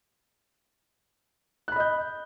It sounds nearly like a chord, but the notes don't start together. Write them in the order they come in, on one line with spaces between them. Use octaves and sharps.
F#6 B5 D#5 G6